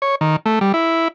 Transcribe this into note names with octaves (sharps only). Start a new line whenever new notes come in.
C#5
D#3
A3
G3
E4